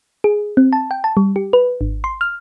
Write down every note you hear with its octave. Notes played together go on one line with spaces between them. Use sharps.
G#4
C4
A5
G5
A5
G3
G4
B4
G#1
C6
F6